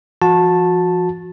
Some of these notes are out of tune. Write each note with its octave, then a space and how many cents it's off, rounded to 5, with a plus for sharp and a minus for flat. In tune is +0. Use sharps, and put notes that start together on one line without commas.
F3 -35 F#4 -30 A5 +0